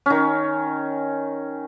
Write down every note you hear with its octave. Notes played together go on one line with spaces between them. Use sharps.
D#3 C#4